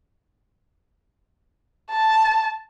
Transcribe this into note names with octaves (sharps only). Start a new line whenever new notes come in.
A5